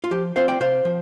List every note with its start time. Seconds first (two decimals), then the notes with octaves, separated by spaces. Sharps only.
0.04 F4
0.11 F3 G4
0.36 C4 F4 C5 F5
0.48 D5 G5
0.60 C3 C5 F5
0.85 F3